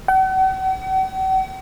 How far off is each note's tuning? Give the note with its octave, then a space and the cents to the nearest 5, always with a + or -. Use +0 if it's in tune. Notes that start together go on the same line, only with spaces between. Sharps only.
F#5 +45